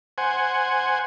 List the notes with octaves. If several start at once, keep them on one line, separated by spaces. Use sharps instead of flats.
C5 F#5 G#5